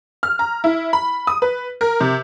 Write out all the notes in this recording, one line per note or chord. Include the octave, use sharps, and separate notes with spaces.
F6
A#5
E4
B5
D#6
B4
A#4
C3